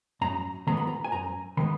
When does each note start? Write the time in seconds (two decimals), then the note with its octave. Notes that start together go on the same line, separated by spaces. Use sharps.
0.21 F#2 A#5
0.67 D#3 G#3 B3 A#5
0.77 B5
0.87 A#5
1.04 G#5
1.12 F#2 A#5
1.57 D#3 G#3 B3 B5